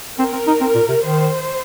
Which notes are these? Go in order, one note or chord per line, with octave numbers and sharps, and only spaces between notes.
C4 A#4
C4
D#4
C4
A#2
C3
D#3 C5